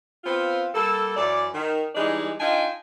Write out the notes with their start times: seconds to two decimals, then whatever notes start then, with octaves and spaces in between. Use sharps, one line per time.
0.24 B3 C4 F4
0.73 G3 A#3 A4
1.15 F#2 E3 D5
1.54 D#3
1.95 E3 G3 G#3 D4 D#4
2.39 D4 D#4 F4 G5 G#5